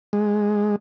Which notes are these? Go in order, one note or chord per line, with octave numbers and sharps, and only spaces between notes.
G#3